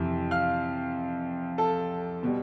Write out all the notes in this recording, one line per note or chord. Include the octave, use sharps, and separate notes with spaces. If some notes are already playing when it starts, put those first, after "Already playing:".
Already playing: F2 C3 E3 E5
F5 F6
A4 A5
B2 G3